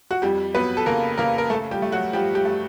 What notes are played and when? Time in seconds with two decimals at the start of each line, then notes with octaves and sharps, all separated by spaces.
0.11 F#4
0.22 F2 G3 G4
0.54 F#3 B3 B4
0.77 A4
0.86 C#3 A#3 A#4
1.18 C#3 A#3 A#4
1.38 A#4
1.50 A3 A4
1.71 G3 G4
1.82 A3
1.92 F#3 F#4
2.13 F3 G3 G4
2.35 G3 G4
2.45 A3